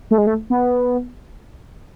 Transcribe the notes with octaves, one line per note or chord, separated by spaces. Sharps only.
A3
G#3
A3
B3